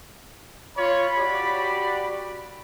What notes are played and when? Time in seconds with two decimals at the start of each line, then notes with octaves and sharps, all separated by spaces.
0.76 F4 C#5 B5
1.18 F#4 G4 D5